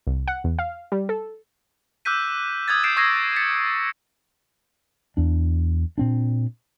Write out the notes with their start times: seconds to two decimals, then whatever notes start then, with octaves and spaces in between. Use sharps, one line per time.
0.07 C2
0.28 F#5
0.44 E2
0.59 F5
0.92 G3
1.09 A4
2.05 D6 E6 F#6 G6 B6 D#7
2.68 D#6 E6 G#6 A6
2.84 E6 G6 A6 C7 D7 E7
2.96 C#6 D#6 E6 G#6 A#6 C7
3.36 A6 B6 C#7
5.17 E2 D4
5.98 A#2 C4 D4